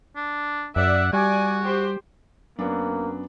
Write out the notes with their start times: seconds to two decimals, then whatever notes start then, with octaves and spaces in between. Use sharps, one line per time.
0.16 D4
0.76 F#2 D5 E5 F#5
1.13 G3 F#4 D5 G#5
1.60 G4 C5
2.59 F#2 F#3 A#3 B3 D4